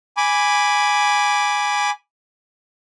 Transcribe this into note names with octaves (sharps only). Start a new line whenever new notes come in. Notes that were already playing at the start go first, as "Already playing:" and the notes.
G#5 B5 D6